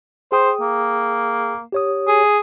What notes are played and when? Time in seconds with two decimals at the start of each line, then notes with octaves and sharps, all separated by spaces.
0.32 G#4 C5 G5 D#6
0.61 A#3
1.72 G4 C#5 D#6
2.08 G#4